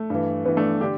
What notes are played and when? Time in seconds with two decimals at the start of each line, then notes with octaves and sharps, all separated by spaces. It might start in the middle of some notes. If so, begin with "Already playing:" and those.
Already playing: A3
0.10 G2 E3
0.45 G2 E3 B3
0.57 A3 D4
0.81 D3 D4 G4